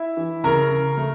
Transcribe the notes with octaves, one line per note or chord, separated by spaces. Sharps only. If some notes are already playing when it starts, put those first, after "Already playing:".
Already playing: E4 E5
E3
C#3 A#4 A#5
C#3
A3